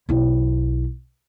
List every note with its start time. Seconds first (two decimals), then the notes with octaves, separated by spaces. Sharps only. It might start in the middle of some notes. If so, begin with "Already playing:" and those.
0.09 B1 E4